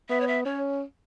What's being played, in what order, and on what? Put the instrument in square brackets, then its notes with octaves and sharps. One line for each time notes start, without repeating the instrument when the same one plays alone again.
[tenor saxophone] B3 [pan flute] E5
[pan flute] C#5
E5
[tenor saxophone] C#4 [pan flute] C#5